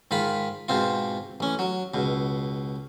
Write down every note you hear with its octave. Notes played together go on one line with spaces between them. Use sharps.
G#2 D#3 F4 B5
G#2 B2 C4 F4
A1 C#4
F#3
C#2 B2